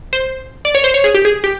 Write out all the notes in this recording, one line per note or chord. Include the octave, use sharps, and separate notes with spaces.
C5
D5
C#5
C5
C#5
G#4
G4
G#4
G4